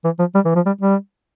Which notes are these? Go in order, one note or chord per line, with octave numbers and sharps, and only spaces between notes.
E3
F3
G3
E3
F3
G3
G3